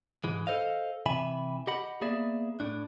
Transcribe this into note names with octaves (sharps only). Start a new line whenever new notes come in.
G#2 E3 G#3
A4 C5 D#5 F5
C3 E3 E5 G#5 B5
G4 D#5 F#5 B5
A#3 B3 G#4 D5 E5
A2 D4